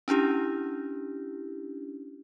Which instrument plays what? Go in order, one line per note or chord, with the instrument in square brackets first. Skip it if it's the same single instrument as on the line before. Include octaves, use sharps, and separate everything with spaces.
[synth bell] C#4 D4 E4 G4